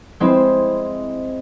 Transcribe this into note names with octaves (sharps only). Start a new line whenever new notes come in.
G#3 C4 E4